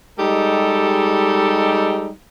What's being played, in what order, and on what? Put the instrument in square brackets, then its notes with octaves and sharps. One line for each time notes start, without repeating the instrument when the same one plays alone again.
[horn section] G3 G#3 D#4 G4 A4